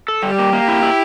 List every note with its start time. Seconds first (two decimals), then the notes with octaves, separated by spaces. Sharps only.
0.08 A4
0.23 G3 G4
0.38 A#3
0.53 A#3
0.68 E4
0.83 E4